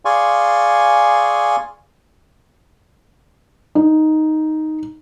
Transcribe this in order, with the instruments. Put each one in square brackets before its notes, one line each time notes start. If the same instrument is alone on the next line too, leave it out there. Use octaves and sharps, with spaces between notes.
[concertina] G#4 D5 F5 G#5 C6 C#6
[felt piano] D#4